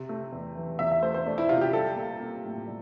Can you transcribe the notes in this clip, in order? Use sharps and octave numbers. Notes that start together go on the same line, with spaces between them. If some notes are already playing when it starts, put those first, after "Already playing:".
Already playing: C3
A3
E2
E3
E2 E5
E5
A3 C5
C5
A3 D4
E4
C3 F4
G4
G3 A4
A#3
A#3
A2
G3